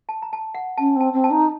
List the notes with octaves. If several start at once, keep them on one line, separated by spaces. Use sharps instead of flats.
A5
A#5
A5
F#5
C#4 A5
C4
A5
C4
A5
D#4